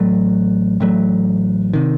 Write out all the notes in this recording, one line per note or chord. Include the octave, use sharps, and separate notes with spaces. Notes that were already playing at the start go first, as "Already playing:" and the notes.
Already playing: A1 A2 F#3 A3
A1 A2 F#3 A3
C3 D#3